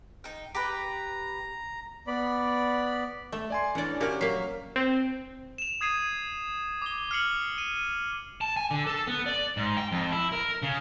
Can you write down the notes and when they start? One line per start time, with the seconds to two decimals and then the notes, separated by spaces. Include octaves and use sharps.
0.24 D#4 G5
0.55 G4 B4 A#5
2.07 B3 D5 B5
3.32 A3
3.50 D5 G#5 C6
3.75 E3 C#4 D4 D5 F#5
4.01 A#3 C#4 F#4 G4 F6
4.21 F#3 A#3 B6 C7
4.76 C4
5.58 E7 F7
5.81 D#6 G#6 C7 D#7
6.82 D6 G7
7.11 F6 C7 C#7 F#7
7.58 D#7
8.41 A5
8.57 G#5
8.71 D3
8.87 A4
9.07 B3
9.26 D5
9.57 G#2
9.77 G5
9.92 F2
10.12 E4
10.32 A#4
10.63 C#3